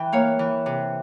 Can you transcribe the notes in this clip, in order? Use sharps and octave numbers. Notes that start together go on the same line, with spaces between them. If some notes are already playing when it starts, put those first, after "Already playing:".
Already playing: E3 G5
A#3 C#5 F5
E3
C3